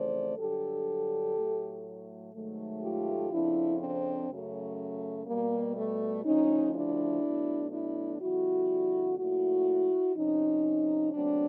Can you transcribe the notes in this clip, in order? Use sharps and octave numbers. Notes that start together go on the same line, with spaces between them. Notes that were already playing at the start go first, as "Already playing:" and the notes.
Already playing: F2 C#3 E3 A3 C5 D5
G2 D3 F#3 G4 A4
A2 F#3 A3
G#2 D#3 F#3 A3
F4 G4
F2 C#3 F3 D4 E4
C4 D4
F#2 C#3 F#3 A3
B2 G3 A#3
A3
D2 C#3 F3 C#4 D#4
D4 E4
B2 F#3 A3
D4 E4
F2 D3 G3 E4 F#4
A#2 F#3 A3 E4 F#4
F2 C3 F3 C#4 D#4
E2 C#3 F#3 A3 C4 D4